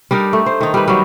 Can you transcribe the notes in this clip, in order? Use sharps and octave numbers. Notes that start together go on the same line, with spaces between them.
G3 D4 D#4 A#4
A3
C5
D#3 D#4
G3 B4
F#3 G3